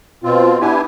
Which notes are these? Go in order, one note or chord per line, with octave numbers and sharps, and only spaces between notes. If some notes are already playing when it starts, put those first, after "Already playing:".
B2 C4 F4
B3 D4 E4 G4 G#5